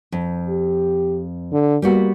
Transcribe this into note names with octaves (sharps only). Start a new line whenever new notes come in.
F2
G4
D3
G3 A#3 B3 F#4